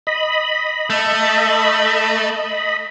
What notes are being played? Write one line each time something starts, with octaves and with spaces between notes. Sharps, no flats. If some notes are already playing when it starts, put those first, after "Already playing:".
D#5 B5
A3